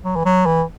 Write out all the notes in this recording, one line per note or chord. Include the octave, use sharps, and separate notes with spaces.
F#3
E3
F#3
E3